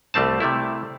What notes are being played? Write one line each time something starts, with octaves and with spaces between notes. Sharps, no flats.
C2 G3 A3 C4 A5
C3 G3 A3 E4